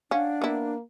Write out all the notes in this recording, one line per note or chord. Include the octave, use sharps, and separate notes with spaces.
C#4 D4 F5 F#5
A#3 B3 E4